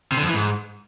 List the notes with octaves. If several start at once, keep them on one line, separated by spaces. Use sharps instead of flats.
C3
D3
F2
E3
G#2